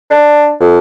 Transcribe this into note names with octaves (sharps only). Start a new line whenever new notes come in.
D4
F2